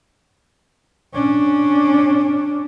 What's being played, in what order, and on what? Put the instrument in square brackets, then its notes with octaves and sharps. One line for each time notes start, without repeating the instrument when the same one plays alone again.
[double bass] C#4 D4